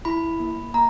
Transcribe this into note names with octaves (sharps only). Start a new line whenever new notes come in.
E4 B5
A#3
A#3 A#5